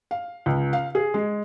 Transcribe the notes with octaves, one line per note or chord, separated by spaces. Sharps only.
F5
C#2
F5
G#4
G#3